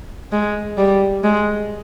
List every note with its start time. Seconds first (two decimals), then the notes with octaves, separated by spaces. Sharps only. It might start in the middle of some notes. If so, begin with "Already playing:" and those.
0.32 G#3
0.78 G3
1.24 G#3